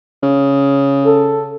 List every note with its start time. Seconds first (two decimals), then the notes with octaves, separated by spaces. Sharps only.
0.23 C#3
1.05 A4